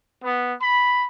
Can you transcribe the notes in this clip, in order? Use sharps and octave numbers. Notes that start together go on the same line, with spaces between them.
B3
B5